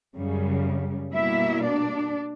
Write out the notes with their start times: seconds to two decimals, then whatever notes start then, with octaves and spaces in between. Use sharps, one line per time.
0.14 F#2 C#3 G3
1.13 B2 G3 A#3 E4 E5
1.63 D4 D5